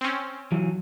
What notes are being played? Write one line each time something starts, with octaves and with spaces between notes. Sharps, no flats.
C4 C#4
E3 F#3